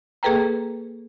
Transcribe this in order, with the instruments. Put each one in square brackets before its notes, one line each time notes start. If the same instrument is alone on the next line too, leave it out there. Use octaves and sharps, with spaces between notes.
[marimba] A#3 G#4 A4 B4 G5 A#5